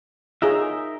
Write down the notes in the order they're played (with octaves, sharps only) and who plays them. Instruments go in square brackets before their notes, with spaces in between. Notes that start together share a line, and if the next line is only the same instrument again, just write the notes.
[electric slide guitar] D#4 A#4 E5 [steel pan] F4 G#4 C#5